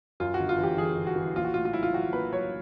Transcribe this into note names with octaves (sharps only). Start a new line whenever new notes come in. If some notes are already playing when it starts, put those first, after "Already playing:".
F#2 F4
F#4
G1
F4
E3 G4
E3 G#4
G1
F#4
E3
A#1 F4
F#4
A2 F4
F4
F#3 E4
F4
F#3 F#4
A#3 B4
F#3 C#5